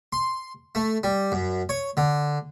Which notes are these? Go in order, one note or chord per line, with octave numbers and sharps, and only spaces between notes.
C6
A3
G3
F#2
C#5
D3